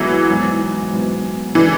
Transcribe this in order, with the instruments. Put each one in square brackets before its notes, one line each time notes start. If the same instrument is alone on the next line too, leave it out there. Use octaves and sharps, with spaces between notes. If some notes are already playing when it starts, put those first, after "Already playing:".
Already playing: [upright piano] E2 D3 G#3 B3 E4 [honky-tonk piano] E3 F#3
[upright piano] G#2 F#3 B3
G#2 F#3 B3
[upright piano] C#3 G#3 D4 A4 [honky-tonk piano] E3